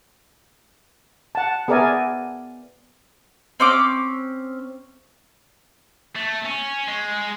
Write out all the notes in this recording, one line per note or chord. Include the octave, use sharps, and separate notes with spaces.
F#5 A5
B3 G#4 A#4 D5 E5 G#5
C4 C#4 D6
A3
C#4
G#3